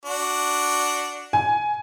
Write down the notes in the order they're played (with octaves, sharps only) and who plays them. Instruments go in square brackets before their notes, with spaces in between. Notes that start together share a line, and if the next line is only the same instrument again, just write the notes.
[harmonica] D4 F#4
[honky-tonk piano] G#5